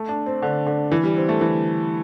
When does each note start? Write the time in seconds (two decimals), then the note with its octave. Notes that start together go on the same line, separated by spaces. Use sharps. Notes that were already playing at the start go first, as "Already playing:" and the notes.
Already playing: A3
0.09 D4
0.26 C4
0.42 D3
0.67 D3
0.92 E3
1.03 G3
1.17 C4
1.29 A3
1.41 E3